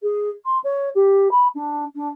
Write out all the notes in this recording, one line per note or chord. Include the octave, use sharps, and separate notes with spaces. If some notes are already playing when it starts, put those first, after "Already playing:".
G#4
C6
C#5
G4
B5
D4
D4